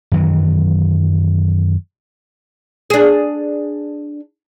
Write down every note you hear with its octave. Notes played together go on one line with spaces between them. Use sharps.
F#2 D#3 E3 F#3
D4 G#4